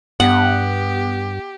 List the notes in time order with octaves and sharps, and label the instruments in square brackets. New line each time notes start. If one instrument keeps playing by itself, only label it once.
[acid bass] G2 [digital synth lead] B3 [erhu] G4 [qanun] F#5